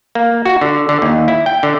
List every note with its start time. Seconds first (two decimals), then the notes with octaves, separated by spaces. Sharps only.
0.15 A#3
0.45 F#4
0.61 D3
0.89 D3
1.02 D#2
1.28 E4
1.46 G5
1.63 D3